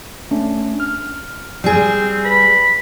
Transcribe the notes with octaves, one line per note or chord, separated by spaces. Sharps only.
A3 C#4 D4
F6
G3 C4 G#4
B4 B5 A#6